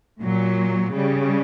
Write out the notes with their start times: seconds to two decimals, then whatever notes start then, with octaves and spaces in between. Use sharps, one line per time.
0.22 A#2 F#3
0.94 C#3 G3